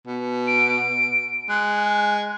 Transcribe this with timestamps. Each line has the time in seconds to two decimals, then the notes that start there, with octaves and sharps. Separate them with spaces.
0.07 B2
0.47 D7
1.49 G#3 F#6